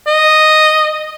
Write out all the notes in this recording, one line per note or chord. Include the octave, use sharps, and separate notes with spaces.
D#5